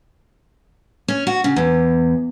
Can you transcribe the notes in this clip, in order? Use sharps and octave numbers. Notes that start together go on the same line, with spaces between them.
C#4
F#4
C#3
E2